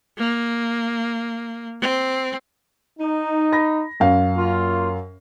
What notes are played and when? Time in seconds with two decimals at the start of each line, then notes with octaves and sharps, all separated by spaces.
0.18 A#3
1.81 C4
2.99 D#4
3.53 B5 A#6
4.00 F#2 F5
4.35 A#3 F4